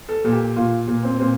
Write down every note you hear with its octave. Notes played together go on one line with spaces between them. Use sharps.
A4
A#2 A4
G4
A#2 F4
A#2
C4
A#2 C4